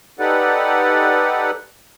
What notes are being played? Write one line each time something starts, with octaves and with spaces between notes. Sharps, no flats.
D#4 G4 A4 B4 D5 F#5